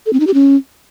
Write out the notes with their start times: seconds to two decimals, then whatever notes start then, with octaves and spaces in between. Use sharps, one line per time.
0.06 A4
0.13 C4
0.20 D#4
0.27 G4
0.34 C#4